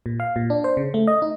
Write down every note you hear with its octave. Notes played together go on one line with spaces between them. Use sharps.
A#2
F5
A#2
D4
C5
C#3
A3
D#5
D#4